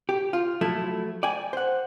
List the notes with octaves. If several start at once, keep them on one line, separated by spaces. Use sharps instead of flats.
G4
F4
F3 F#3 A3 E4
D5 G5 G#5
C5 F#5